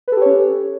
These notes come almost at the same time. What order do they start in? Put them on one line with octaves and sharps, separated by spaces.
B4 A4 G4 C#5 C#4